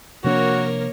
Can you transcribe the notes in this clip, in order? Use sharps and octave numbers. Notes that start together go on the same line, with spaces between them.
C3 F3 A#3 D4 F#4 A#4 C#5